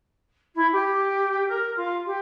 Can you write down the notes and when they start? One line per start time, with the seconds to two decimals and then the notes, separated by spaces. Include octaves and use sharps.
0.55 E4
0.72 G4
1.48 A#4
1.76 F4
2.06 G4